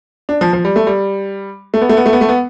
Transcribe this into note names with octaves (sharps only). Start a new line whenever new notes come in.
D4
F3
F3
G3
A3
G3
A3
B3
A3
B3
A3
B3
A3
B3